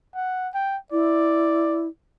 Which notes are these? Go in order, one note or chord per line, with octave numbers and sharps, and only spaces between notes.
F#5
G5
E4 D5